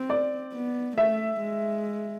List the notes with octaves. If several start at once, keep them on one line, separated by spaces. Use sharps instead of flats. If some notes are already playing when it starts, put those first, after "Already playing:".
Already playing: C4
D5
B3
A3 E5
G#3